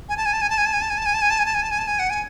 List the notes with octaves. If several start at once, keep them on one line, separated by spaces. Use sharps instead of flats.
G#5
A5
G#5
A5
G#5
A5
G#5
A5
G#5
A5
G#5
A5
G#5
A5
G#5
A5
G#5
A5
G#5
A5
G#5
A5
G#5
F#5
G#5